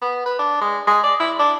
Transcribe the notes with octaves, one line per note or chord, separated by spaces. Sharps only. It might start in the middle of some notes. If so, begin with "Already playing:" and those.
B3
B4
D4
G#3
G#3
D5
E4
D4